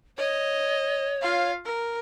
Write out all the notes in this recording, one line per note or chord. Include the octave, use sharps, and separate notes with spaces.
C#5 D#5
F4 F5
A#4